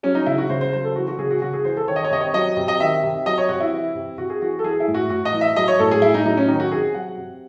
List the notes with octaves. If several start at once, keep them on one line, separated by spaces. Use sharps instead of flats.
F#3 C#4
D#4
C#3 E4
F#4
C#3 C5
C5
F#3 C5
A4
E3 F#4
F#4
C#3 G#4
F#4
C#3 F#4
G#4
E3 C5
A4
D#3 C#5
D#5
C#5
C3 D#5
C#5
F#3 D#5
C3
D#5
D#3 E5
C3
F#3 D#5
C#5
C3 F#4
E4
E3
C3
C3 F#4
G#4
E3 F#4
A4
E3 G#4
E4
A2
F#4
A2 F#4
D#5
E3
E5
F#3 D#5
C#5
A2 A4
G#4
A2 E4
D#4
F#3 D#4
C#4
D#3 D#4
F#4
C3 G#4
F#3 F#5
C3